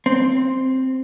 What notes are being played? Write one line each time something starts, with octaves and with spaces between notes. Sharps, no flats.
C4